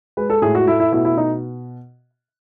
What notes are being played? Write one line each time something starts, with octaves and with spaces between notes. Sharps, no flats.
G#3 B4
A4
A2 G#4
F#4
A3 E4
E4
B2 E4
E4
B2 D#4